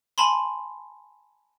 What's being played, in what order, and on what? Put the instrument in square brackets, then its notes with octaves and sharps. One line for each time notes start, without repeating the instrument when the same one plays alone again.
[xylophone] G#5 A5 B5 C6